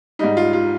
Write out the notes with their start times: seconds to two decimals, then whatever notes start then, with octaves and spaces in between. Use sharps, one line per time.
0.19 G#2 G3 D#4
0.37 F4
0.53 F4